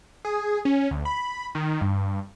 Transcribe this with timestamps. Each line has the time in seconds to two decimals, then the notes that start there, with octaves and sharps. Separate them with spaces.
0.25 G#4
0.65 C#4
0.91 D2
1.05 B5
1.55 D#3
1.81 G2